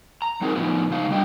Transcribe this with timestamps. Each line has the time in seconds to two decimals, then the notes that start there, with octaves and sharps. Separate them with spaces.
0.22 A#5
0.41 F#3 C4 D#4 G#4 A#4
0.56 A2 F3 B3 D#4 F4
0.90 C#3 G#3 D#4 F5
1.11 G3 D4 D#5 G5